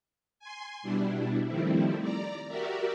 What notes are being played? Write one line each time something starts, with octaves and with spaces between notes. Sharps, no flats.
G#5 C6
B2 G3 D4 E4
D#3 F3 G3 A3 C4 E4
D5 A#5
F#4 G4 A#4 D5 E5